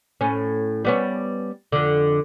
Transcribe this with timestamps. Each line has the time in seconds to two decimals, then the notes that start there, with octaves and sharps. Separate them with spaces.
0.21 A2 C#4
0.85 G3 B3 C#4
1.72 F2 D3